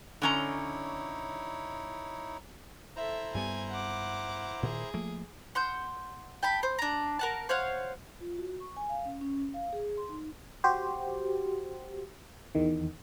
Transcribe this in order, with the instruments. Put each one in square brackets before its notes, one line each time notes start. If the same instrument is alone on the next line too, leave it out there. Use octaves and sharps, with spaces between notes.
[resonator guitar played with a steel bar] D3 C#4 A#5 [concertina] D#4 E4 C#5
[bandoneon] E4 C5 A#5 [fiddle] A4 E5
[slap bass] G2 G3 B3 [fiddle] G#5
[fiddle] F#5 D6
[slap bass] A#2 D#3 [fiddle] G#4
[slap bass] F3 A3 A#3
[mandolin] F#5 C6 E6 G6
G5 A5 B5
C5
D4 A#5
A#4 F#5 A5
C5 C#5 F5 F#5
[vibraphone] F4
F#4
C#6
G#5
F5
C#4
C#4
F5
G#4
C6
D#4
[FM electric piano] F#4 G4 C5
E2 D#3